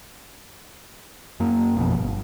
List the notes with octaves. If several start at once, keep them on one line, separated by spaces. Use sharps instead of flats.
F#2 A#3
A1 F2 B2
G1